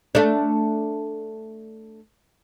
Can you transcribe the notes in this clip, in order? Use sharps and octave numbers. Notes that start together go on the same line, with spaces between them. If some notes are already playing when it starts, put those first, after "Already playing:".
A3 D4